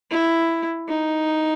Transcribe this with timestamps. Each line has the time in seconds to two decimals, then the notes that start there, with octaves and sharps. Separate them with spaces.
0.11 E4
0.89 D#4